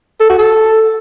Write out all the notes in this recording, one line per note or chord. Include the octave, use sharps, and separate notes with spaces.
A4
F#4
A4